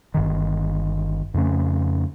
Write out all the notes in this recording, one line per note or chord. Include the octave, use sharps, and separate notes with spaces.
G1 G2 D#3
F2 C#3 A3 C#4